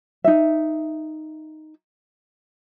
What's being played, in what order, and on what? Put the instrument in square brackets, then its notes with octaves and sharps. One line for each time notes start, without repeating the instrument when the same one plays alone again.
[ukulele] D#4 E5